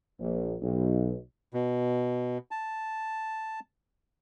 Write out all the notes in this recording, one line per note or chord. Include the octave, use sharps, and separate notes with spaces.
A#1
B1
B2
A5